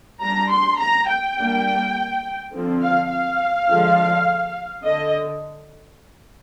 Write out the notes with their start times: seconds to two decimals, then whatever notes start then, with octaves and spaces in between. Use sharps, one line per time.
0.22 G3 D4 A#5
0.51 C6
0.80 A#5
1.09 G5
1.37 G3 A#3 D4
2.53 D3 F3 C4
2.82 F5
3.11 F5
3.69 D3 F3 G#3 D4
4.84 D3 D#5